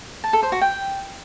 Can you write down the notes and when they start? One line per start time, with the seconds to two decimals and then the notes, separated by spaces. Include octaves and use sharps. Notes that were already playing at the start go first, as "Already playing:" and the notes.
0.24 A5
0.33 A4
0.43 C5
0.52 F#4
0.61 G5